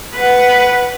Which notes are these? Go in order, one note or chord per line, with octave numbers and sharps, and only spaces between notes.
B4 F#5